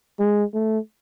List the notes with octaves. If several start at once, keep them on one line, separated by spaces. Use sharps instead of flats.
G#3
A3